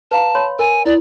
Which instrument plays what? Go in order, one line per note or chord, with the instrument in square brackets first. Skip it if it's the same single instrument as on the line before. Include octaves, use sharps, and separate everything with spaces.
[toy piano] B4 F5 A#5 [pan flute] A5
[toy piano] C#5 B5 C6
[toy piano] A#4 [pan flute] G#5
[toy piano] E4 [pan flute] D5